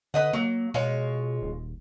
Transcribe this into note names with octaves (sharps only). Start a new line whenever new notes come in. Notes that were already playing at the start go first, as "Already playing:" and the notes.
D3 B4 D#5 F#5
F#3 A#3
B2 G#3 F4 C#5
D#1